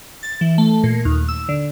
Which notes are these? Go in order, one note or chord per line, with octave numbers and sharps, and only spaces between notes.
A6
E3
A3
A#2
D#2
E6
D3